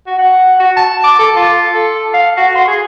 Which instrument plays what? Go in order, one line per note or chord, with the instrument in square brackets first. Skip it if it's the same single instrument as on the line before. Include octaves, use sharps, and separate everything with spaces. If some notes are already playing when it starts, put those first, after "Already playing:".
[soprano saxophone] F#4
F#5
F#4
A5
D6
A4
F4
A4
F5
F#4
C6
G#4